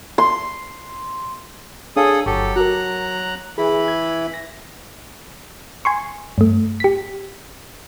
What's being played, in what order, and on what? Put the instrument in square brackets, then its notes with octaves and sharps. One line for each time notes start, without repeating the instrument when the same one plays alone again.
[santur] C6
[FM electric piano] D4 C#5 F5 [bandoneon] G#4 A4 D#6
[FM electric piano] G1 C#6 [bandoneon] F#3 G4 A4
[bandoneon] F#3 A#5 F#6 [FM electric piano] F#4 A#4
[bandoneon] E3 E4 B5 [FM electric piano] G#4
[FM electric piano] G#6
A#6
[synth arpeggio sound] G#5 C6 C#6
G2 A3
G4 B6